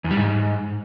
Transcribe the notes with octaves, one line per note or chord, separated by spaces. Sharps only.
E2
G3
G#2